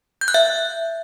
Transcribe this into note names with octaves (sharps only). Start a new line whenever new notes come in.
G6
F#6
E5